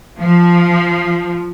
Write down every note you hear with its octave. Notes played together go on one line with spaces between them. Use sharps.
F3